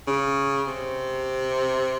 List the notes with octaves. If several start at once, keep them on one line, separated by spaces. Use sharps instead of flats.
C#3
C3